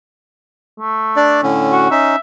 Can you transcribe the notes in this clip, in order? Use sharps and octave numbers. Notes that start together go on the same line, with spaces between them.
A3
D4 D5
A2 D3 C#4
F#4
C#4 D#4 E5